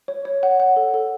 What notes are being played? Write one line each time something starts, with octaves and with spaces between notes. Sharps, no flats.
C#5
C#5
F#5
F#5
A4
A4